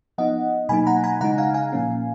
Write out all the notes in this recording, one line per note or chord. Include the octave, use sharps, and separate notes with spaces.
F3 B3 D#4 D#5 F#5
B2 F#3 A#3 D#4 G#5 B5
F#5 A#5
G#5 B5
C#3 G#3 D#4 F#5 A#5
F5 G#5
F5 G#5
A#2 F3 A#3 C#4